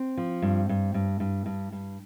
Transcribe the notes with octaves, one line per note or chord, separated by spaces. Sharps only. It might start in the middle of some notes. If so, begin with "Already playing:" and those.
Already playing: C4
F3
G2
G2
G2
G2
G2
G2